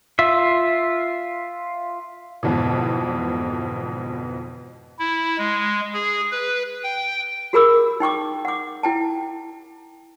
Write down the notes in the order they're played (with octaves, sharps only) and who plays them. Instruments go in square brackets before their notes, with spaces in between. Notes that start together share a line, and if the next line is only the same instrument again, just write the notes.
[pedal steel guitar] F4 E5
[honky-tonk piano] F2 G#2 B2 D3 E3
[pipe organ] E4
G#3
G#4
B4
G5
[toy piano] F#4 G#4 A#4 B5 D6 E6
D#4 G5 C#6 D6
F#5 D6
E4 G5 A5